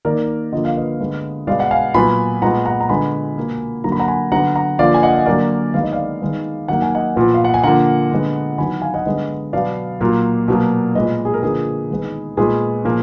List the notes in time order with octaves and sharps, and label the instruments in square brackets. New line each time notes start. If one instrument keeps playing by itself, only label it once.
[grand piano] D#3 A#3 A#4 D5
D3 F3 A#3 D#5
F5
B4 D#5
D3 G#3 B3
B2 G#3 B3 D5 F5
F#5
F5 G#5
A#2 F#3 B3 G#5 B5
A#2 G#3 B3 F#5 A#5
F#5 A#5
A#5
D3 G#3 B3 G#5 B5
B2 A#3
D3 F#3 A#3 A#5
B5
F#5 A#5
G#5 B5
D3 F#3 B3 F#5 A#5
F#5 A#5
D3 F3 A#3 D5 F5
G#5
D#5 F#5
D#5
D3 F#3 A#3 A#4 D5
D#3 G#3 B3 F5
D#5
D5 F5
D#3 G#3 B3
D#3 F#3 A#3 F#5
G#5
D#5 F#5
A#2 F3 B3
F5
F#5
G#5
D3 F3 A#3 F#5 A#5
D3 G#3 B3
D#3 F#3 B3 G#5 B5
F5 G#5
D#5 F#5
D3 G#3 B3 B4 D#5
B2 F#3 B3 D5 F5
A#2 F#3 A#3
B2 F#3 A#3
A#2 G#3 B3 B4 D#5
G#4
A#4
D3 F3 A#3 G#4 B4
D#3 G#3 B3
A#2 G#3 B3 G#4 B4
A#2 F3 A#3